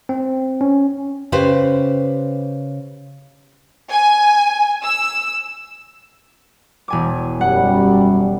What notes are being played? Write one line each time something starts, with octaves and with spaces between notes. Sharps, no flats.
C4
C#4
C#3 G4 B4 C5
G#5
E6
E1 G#5 D6
F#2 G3 F#5